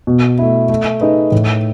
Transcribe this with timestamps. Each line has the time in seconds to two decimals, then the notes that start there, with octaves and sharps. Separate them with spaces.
0.07 B2
0.39 A3 E4
0.69 A3
1.01 D#4 G#4 B4 D#5
1.32 A2